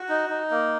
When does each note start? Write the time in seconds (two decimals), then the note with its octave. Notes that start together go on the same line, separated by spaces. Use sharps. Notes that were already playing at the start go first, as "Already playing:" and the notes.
Already playing: F#4
0.09 D#4
0.29 D#4
0.50 A#3